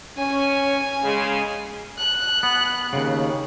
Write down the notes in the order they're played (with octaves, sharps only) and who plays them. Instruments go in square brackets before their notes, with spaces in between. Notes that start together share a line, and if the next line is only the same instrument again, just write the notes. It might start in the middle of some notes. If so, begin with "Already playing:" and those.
[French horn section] C#4 [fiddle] G#5
[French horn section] C#3 G#3
[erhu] F#6
[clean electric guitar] B3
D#2 C#3